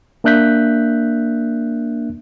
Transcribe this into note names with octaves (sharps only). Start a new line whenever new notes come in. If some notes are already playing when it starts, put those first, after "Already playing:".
A#3 D4 E5 F#6 G6 B6